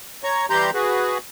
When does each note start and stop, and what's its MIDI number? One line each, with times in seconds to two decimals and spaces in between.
0.24 0.46 73
0.24 0.46 82
0.24 0.46 85
0.50 0.70 52
0.50 0.70 55
0.50 0.70 67
0.50 0.70 82
0.50 0.70 84
0.50 0.70 91
0.74 1.18 66
0.74 1.18 68
0.74 1.18 71